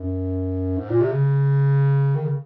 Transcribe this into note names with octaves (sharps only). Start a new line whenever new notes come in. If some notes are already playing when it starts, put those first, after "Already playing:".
Already playing: F#2
G#2
A#2
C3
C#3
D#3
C#3